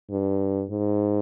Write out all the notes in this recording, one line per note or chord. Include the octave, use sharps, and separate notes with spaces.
G2
G#2